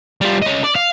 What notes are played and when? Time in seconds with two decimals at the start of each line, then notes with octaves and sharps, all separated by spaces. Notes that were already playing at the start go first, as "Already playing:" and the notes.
0.21 G3 F4
0.42 C#4 D#5
0.64 D5
0.75 F5